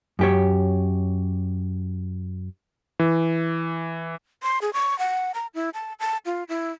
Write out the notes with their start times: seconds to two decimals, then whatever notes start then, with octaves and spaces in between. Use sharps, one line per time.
0.19 F#2 G4 C#5
2.99 E3
4.43 C6
4.62 G#4
4.73 C#6
4.99 F#5
5.34 A#5
5.55 E4
5.74 A5
6.00 A5
6.26 F4
6.49 E4